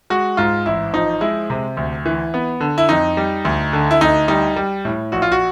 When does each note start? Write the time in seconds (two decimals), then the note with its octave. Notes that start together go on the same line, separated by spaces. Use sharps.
0.10 G#3 F#4
0.37 G#2 F4
0.66 A1 E4
0.93 F3 D#4
1.21 G#3 E4
1.50 C3
1.77 D2
2.06 E3
2.34 B3
2.60 D3
2.78 E4
2.89 F2 D#4
3.17 G3
3.45 D2
3.73 D3
3.91 E4
4.01 D2 D#4
4.28 G3 D#4
4.56 G3
4.85 A2
5.12 A#1 F#4
5.22 F4
5.32 F#4